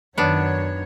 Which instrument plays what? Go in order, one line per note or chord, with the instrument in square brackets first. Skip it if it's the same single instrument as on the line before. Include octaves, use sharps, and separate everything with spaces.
[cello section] F#2 D#3 C#5 [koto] B3 D4